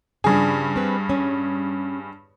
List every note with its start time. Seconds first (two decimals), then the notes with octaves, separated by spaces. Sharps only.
0.24 G2 C#3 F3 D4 G#4
0.76 C4 B4
1.10 C#4